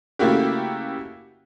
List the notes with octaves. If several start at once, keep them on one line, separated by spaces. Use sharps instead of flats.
C#3 A3 A#3 E4 F#4 G4